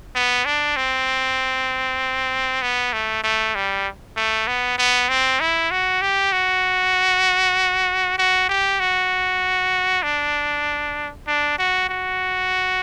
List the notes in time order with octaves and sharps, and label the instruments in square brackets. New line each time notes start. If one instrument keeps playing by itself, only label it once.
[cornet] B3
D4
C4
B3
A3
A3
G3
A3
B3
B3
C4
E4
F#4
G4
F#4
F#4
G4
F#4
D4
D4
F#4
F#4